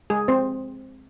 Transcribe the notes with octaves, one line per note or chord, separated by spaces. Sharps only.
G#3 G#4
C4 C5